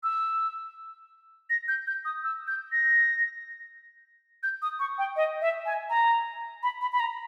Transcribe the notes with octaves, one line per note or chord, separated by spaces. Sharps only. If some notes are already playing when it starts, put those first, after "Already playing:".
E6
A#6
G6
G6
D#6
E6
G6
A#6
G6
D#6
C#6
G5
D#5
E5
G#5
A#5
B5
B5
B5
A#5